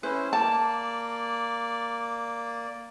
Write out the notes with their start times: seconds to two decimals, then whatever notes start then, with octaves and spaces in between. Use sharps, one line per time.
0.03 C#4 E4 B4 C5
0.33 A#3 D5 A5